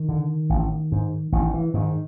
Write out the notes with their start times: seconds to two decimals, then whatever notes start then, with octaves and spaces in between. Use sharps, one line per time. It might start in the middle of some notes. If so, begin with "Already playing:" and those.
Already playing: D#3
0.09 D3
0.50 A1
0.92 G#2
1.32 A1 D#3
1.54 E3
1.74 G#2 D#3